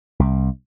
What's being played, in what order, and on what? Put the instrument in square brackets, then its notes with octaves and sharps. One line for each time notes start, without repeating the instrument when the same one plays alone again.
[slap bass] C2